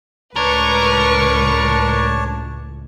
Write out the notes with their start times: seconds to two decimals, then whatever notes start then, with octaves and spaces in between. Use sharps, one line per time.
0.36 C#2 A2 D4 A#4 B4 C#5 A5 C#6